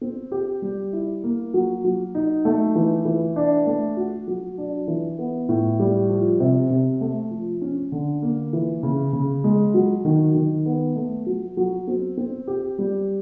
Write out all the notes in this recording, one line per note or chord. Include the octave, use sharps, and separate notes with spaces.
C4
G4
G3
E4
A#3
F#3
F#3
D#4
A3
E3
E3
D4
A3
F#4
F#3
D4
E3
B3
A2
G3
F3
C3
C3
A3
F3
C#4
D3
A#3
E3
C#3
C#3
G#3
F#3
D#3
D#3
B3
A3
F#3
F#3
C4
C4
G4
G3